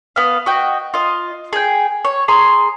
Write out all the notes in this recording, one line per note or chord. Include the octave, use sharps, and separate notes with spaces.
B3 F5
F#4 D#5 G5
F4 D#5
G#4 G5
C#5
G#4 A#5 C6